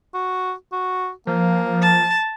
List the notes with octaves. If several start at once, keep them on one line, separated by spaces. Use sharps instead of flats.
F#4
F#4
F3 A#3
A5